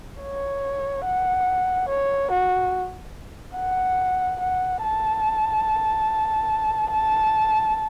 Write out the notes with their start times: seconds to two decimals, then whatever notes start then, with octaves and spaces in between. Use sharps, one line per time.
0.21 C#5
1.05 F#5
1.88 C#5
2.31 F#4
3.56 F#5
4.40 F#5
4.83 A5
6.91 A5